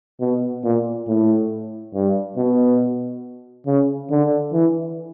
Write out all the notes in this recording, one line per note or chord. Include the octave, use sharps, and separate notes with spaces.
B2
A#2
A2
G2
B2
C#3
D3
E3